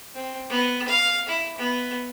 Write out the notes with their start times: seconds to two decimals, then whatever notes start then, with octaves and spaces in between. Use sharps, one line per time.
0.15 C4
0.50 B3
0.88 F5
1.28 E4
1.58 B3